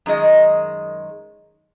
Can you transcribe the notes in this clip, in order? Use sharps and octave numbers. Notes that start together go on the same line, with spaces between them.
F#2 D#3 G#3 D#5